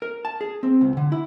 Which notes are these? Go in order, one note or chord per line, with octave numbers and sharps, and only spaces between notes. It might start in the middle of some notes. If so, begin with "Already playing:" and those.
A#4
A5
G#4
C4
C#2
D3
E4